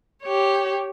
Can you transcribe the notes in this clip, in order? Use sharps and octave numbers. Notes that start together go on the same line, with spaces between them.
G4 C#5